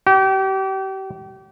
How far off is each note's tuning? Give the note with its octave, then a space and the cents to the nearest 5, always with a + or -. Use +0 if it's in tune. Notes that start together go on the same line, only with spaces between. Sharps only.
G4 -35